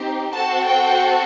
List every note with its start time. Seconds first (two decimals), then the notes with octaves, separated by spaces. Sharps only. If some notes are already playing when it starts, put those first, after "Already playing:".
Already playing: C4 D#4 G4
0.32 C4 F#4 A4 A5
0.67 G5